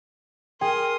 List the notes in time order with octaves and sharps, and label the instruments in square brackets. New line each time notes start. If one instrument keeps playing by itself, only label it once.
[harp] G#4 [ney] A#4 [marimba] G5 [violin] C6 D#6